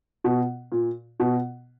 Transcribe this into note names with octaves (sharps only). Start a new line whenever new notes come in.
B2
A#2
B2